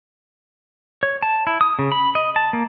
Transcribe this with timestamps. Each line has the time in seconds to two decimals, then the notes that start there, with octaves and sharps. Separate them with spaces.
1.03 C#5
1.23 A5
1.47 E4
1.61 D#6
1.79 C#3
1.92 B5
2.15 D#5
2.36 A5
2.53 A#3